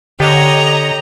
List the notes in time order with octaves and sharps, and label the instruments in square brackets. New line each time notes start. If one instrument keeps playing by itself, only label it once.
[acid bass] D3 [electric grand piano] G4 [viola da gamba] C#5 [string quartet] D#5 A#5